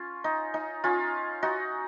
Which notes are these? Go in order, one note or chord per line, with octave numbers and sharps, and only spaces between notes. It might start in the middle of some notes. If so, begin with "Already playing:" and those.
Already playing: C#4 F4
D#4
D#4
C#4 F4
D#4 F#4